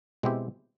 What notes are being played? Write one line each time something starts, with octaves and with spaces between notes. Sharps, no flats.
B2 G#3 C4 E4 G4